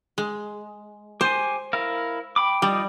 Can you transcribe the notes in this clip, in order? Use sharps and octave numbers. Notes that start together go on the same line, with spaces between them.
G#3
G4 C5 G#5
E4 A#4 F5
G5 B5 D6
F3 G3 D#4 D5